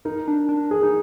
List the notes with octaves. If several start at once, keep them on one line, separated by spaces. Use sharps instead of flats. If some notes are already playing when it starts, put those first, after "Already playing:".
D#4 A#4
D4
D4
G#4
D#4